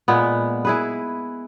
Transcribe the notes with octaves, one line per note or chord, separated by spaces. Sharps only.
A#2 G#3 B3
E4 G#4 B4